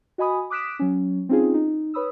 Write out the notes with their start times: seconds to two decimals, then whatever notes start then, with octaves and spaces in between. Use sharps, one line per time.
0.18 F#4 D#5 G#5 B5 D#6
0.50 D6 D#6 F#6 B6 D7 E7
0.79 F#3 C#4
1.29 C4 C#4 D#4 F4 G#4
1.54 D#4
1.94 B4 C#5 B5 D#6 E6